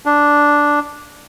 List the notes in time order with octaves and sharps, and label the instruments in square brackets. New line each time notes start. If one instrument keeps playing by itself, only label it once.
[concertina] D4